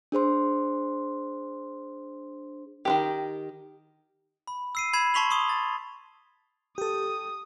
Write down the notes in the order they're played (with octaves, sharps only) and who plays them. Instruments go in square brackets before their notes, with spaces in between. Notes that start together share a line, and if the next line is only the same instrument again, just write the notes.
[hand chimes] D4 G#4 C5 C6
[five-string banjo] D#3 E3 G4
[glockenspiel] B5
E6 C7 D#7
B5 G#6 C7 E7
A5 C6 C#6 B6 F7 F#7
C6 C#6 D#6 G7
A6
[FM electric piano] G4 A4 [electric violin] D#6